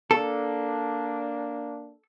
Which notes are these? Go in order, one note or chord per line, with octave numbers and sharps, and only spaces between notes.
A#3 D4 A4